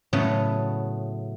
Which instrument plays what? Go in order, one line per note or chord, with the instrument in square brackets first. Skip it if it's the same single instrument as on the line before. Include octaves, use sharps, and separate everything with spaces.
[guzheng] A2 C#3 F#3 A3 B3